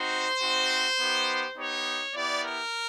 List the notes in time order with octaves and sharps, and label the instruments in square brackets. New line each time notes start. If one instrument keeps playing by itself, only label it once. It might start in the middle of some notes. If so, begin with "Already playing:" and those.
Already playing: [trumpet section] C4 D#4 F#4 C5
C4 D#4 F#4
B3 D#4 G4
B3 D#4 G4 C#5
B3 E4 G4 D5
A#4